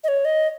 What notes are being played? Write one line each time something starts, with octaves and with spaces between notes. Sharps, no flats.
D#5
C#5
D#5